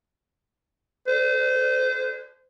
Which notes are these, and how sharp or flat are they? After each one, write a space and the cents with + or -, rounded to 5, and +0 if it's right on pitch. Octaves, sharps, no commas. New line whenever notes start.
C5 -30